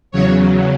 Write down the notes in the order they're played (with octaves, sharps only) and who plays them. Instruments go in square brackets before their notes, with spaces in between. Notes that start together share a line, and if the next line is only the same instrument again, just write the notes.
[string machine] E2 C#3 F#3 C#5